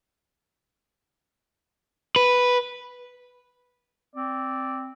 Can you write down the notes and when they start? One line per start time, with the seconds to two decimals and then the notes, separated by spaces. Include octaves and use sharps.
2.16 B4
4.16 C4 D5